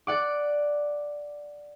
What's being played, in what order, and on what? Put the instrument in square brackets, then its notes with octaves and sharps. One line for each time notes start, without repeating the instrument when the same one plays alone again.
[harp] D5 F#5 D6